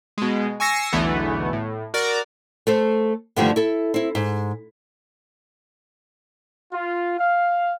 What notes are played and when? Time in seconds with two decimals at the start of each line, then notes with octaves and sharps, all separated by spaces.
0.18 B2 G#3
0.60 G#5 C#6 E6 A#6 C7 C#7
0.93 B1 E2 D3 E3 A3 B3
1.53 A2
1.94 F#4 A#4 D5
2.67 A3 A4 C5
3.36 G2 D3 D#3 F3 G3 A3
3.56 E4 A4
3.94 C4 E4
4.15 G#2
6.73 F4
7.19 F5